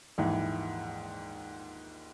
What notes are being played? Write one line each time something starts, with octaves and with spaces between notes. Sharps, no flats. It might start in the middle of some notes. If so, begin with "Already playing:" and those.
A#1 D#2 G#2 E3